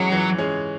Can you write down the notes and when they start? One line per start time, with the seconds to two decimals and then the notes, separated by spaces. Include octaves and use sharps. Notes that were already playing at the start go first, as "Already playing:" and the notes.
Already playing: E3 F#3 G#3 C#4 G#4 C#5
0.12 E3
0.38 G#3 C#4 G#4 C#5